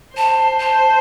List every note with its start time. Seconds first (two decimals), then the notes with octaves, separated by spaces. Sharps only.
0.17 C5 A5
0.60 A5